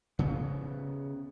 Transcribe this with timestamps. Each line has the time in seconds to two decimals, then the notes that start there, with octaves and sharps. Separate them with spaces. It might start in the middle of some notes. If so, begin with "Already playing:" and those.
0.19 C#3 B3